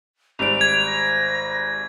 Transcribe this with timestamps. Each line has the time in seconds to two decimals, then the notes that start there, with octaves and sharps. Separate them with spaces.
0.39 G#1 G3 D7 F7
0.61 G#6
0.87 A#6